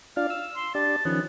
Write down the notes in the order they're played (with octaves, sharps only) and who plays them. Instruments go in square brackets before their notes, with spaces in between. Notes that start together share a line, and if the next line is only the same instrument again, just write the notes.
[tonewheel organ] D4 F4 D5 [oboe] F5
[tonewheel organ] E6
[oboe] C6
[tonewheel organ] D4 G4 D5 [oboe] A5
[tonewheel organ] D#3 F3 C#4 [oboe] B3